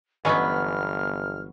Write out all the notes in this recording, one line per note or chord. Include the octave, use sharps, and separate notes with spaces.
G1 E3 F#3 G#3 B3 C#4 D#4 F6